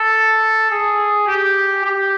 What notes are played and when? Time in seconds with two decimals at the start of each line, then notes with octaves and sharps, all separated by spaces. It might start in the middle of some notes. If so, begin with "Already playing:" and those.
Already playing: A4
0.71 G#4
1.27 G4
1.84 G4